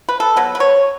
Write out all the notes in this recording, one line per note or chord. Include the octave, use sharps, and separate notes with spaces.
B4
A4
B2 F#3 B3 B4
B4
C#5